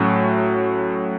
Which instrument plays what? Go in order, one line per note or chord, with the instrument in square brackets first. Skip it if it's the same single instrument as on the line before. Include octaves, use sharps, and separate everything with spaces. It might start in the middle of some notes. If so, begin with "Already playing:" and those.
Already playing: [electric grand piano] A2 F#3 A3 C#4